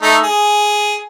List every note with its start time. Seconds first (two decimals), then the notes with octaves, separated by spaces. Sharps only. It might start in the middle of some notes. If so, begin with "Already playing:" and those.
0.02 A3 D#4
0.24 G#4